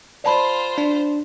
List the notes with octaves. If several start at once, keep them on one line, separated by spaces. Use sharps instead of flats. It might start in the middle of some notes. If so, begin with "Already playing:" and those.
F4 C5 D5 A5 B5
D4